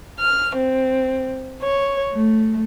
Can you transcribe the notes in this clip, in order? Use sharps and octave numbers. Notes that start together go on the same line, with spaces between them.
F6
C4
C#5
A3